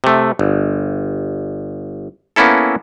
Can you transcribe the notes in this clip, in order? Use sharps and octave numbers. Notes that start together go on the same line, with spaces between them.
C3 A3
G1
A#3 B3 C#4 E4 A4